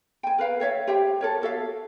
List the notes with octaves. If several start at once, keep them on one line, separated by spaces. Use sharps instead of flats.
G5 G#5
A#4 B4 F5 G5
A4 C#5 E5 F5
G4 C5 E5 G5
A4 A#4 C#5
F#4 A4 E5 F5